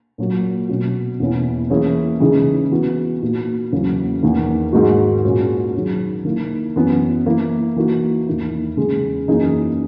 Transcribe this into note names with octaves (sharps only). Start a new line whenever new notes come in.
A#2 F#3 A#3
B2 F#3 C#4 F#4
E2 B2 A#3 C#4 E4
E3 A#3 C#4 E4 G#4
C#3 E3 G#3 D#4 G#4
E3 B3 F#4
A#2 A#3 D#4 F#4
E2 C#3 F#3 A#3 E4
E2 D#3 A#3
G#2 D#3 G#3 D#4 F#4
A#2 G#3 C#4 F#4
D#3 F#3 C#4 G#4
D#3 A#3 E4
F#2 E3 B3
E3 A#3 E4
E3 A#3 D#4 F#4
E2 D#3 A#3 E4
E2 C#3 G#3
F#2 E3 A#3 D#4 G#4